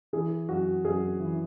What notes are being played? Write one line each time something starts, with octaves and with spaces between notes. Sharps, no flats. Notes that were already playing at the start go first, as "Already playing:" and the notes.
E3 G#4
F#2 F#4
F#2 G#4
E3